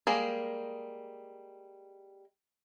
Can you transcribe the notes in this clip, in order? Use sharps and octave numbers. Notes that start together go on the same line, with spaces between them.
G3 G#3 A#3 G#4